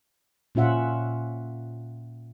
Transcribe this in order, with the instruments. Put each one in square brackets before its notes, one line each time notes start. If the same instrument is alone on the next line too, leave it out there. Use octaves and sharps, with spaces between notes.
[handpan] A#2 C#4 F4 E5 F#5